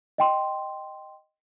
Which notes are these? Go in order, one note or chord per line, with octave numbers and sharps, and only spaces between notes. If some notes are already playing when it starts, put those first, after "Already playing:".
D#5 G5 C6